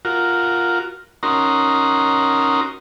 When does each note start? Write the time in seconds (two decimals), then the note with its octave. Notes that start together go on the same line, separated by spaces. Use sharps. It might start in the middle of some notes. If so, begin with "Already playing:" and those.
0.05 F4 F#4 A#4
1.23 C#4 D#4 F#4 A#4 A#5 C6